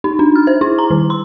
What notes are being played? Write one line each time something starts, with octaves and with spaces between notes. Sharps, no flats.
D#4
D4
F6
C5
E4
A#5
D#3
C6